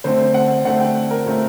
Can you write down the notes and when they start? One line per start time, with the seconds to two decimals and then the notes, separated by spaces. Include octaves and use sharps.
0.04 D3 A3 C4 C5
0.34 F#5
0.65 D3 A3 C4 F#5
0.80 G5
1.11 A#4
1.26 A#2 A3 C4